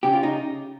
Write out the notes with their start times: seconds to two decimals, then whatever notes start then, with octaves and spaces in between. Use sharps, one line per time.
0.03 C#3 G4
0.13 F4
0.23 D#4